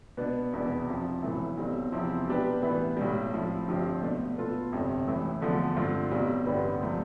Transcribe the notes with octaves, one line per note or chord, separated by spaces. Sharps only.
B2 B3 D4
F1 E2 B2 B3 D4
F1 F2 C3 F3
B1 A2 E3 A3 E4
B1 B2 G3 C4
E2 C3 F3 C4 E4
B2 G3 D4 G4 B4
A2 E3 G3 B3
B1 A2 G3
A2 F3 C4 E4
G1 G2 F3 C4 G4
B2 A3 D4
B2 B3 F4 A4
G1 F2 C3 G3
A1 A2 E3 A3 E4
E2 D3 F3 A3
G2 D3 A3 C4 F4
B1 B2 G3 C4
A1 G2 D3 G3 B3
C3 F3 A3 C4